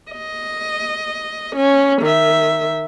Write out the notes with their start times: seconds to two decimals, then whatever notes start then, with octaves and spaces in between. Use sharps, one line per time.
0.12 D#5
1.56 C#4
2.02 D#3 E5